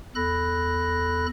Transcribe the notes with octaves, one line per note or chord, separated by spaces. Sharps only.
E2 A4 B5 F#6 A#6